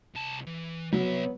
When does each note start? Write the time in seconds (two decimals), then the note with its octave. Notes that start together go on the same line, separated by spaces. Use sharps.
0.15 C2 A5
0.47 E3
0.93 C2 F#3 B3 C#5 E5